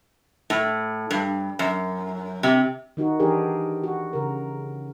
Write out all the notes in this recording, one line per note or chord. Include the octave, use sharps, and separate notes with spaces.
A2
G2
F#2
C3
D#3 D#4 F#4
E3 D4 G4 G#4 A#4
F#4
C#3 A#4